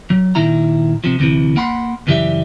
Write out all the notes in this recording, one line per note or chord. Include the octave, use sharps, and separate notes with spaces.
F#3
A#2 D#3 E4 A#5
C3 F3
D2 C3 E3
A#3 F#5 B5 C6
C#2 F#2 E3 G3 G4 E5